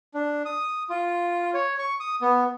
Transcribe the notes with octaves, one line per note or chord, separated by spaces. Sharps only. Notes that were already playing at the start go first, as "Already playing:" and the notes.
D4
D#6
F4
C#5
C#6
D#6
B3